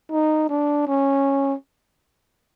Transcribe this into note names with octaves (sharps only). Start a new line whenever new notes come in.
D#4
D4
C#4